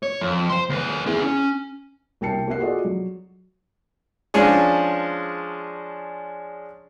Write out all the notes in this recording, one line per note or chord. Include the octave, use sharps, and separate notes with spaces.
C#5
F2
C5 C6
D#2 B4
E4 G#4
C#4
C2 A#3 G5 A5 C7 C#7
A#3 G4 F#5 C7
F4 F#4 G#4 A4 D5 D#5
F#3
F3 G#3 C#4 D4 G#4